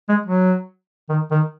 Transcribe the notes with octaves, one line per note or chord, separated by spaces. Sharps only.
G#3
F#3
D#3
D#3